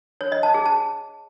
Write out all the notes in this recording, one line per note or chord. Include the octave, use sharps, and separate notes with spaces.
C#5
D#5
A5
G#4
A5